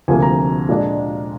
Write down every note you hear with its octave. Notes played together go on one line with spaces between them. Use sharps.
D2 C3 F3 A#3 G#5
A#5
A#2 G#3 D4 F4